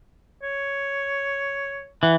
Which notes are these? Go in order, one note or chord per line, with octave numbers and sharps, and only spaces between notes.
C#5
E3 F#5